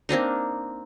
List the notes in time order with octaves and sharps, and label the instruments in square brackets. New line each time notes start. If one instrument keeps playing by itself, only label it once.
[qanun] A#3 C4 D4 D#4